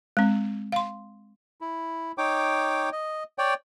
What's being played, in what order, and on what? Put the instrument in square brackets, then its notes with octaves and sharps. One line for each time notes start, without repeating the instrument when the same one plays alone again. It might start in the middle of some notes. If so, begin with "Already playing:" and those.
[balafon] G#3 C4
F5 C6
[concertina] E4
D#4 C#5 G5 D6
D#5
C#5 D5 G5